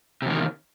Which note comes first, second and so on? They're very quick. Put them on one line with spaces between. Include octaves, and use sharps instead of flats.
C3 E2 D#3